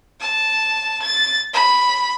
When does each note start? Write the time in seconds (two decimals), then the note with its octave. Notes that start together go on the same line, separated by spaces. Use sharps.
0.21 A5
1.02 A6
1.53 B5